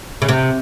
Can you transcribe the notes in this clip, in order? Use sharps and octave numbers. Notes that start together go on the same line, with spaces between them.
C#3
C3